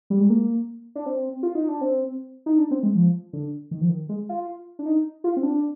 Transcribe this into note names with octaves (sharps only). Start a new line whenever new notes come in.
G3
G#3
A#3
D4
C4
F4
D#4
D4
C4
D#4
D4
C4
G#3
F3
D3
D#3
F3
D#3
G#3
F4
D4
D#4
F4
C4
D4